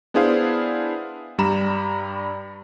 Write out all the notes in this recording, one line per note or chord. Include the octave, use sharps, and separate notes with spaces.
B3 D4 E4 G#4 C5 F5
G2 G3 A#5 B5 E7